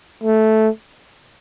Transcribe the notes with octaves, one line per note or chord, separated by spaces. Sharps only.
A3